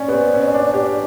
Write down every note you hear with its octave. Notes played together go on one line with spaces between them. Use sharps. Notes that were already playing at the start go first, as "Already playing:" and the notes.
Already playing: C#4 D5
B3
C4
C#4
D4
G4